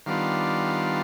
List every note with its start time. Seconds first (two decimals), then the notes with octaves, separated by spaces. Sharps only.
0.06 D#3 G3 B3 D4 F4 F5